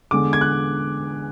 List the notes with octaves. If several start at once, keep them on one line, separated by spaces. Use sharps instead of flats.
E2 D3 G#3 D6
G#6
F#6